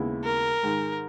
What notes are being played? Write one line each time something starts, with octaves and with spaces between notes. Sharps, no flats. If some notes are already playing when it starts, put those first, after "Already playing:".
Already playing: D#2 C#3 G#3 B3 E4
A#4
G#2 D#3 G#3